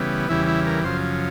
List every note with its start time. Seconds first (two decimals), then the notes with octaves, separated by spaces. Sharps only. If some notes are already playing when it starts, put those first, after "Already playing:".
Already playing: C#3 E3 G3 B3
0.29 E2 C#3 E3 G3 E4
0.48 E4
0.67 A#4
0.84 F#2 C#3 F3 C5